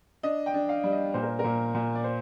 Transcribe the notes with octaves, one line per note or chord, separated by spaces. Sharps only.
D4 D#5
G5
D4
F5
G3
D#5
A#2 C5
A#4
A#4
A#2
A#2
D5
C5